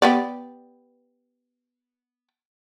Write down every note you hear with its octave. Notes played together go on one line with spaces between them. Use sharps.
B3 G4 D5